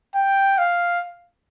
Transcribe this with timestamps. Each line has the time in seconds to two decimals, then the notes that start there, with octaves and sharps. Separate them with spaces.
0.15 G5
0.58 F5